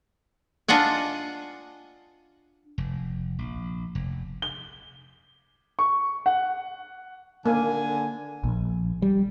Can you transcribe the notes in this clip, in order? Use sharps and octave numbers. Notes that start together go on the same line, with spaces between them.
D4 F4 D#5 F#5 G#5
F1
A#1
F1
G7
C#6
F#5
D3 A#3 G#5
A#1
G3